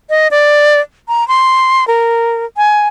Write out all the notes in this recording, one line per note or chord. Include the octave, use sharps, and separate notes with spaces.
D#5
D5
A#5
C6
A#4
G#5